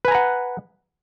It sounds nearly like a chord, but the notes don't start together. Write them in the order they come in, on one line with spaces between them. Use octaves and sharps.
B4 G#5 A#5 F#5